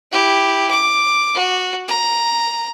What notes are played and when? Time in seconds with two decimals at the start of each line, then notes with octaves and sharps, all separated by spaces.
0.12 E4 G4
0.70 D6
1.35 F#4
1.88 A#5